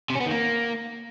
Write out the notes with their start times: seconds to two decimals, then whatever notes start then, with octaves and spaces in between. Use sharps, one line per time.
0.10 C3
0.15 C#4
0.20 B3
0.26 D#3
0.31 A#3